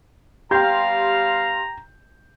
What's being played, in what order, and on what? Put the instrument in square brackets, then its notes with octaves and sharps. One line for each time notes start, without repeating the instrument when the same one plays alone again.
[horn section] G3 B3 F5 [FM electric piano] G4 C6 [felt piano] G5 G6 [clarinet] A#5